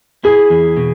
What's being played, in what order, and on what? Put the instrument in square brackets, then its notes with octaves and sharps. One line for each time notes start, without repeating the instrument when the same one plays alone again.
[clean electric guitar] E4 [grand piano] G#4
[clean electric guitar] E2
B2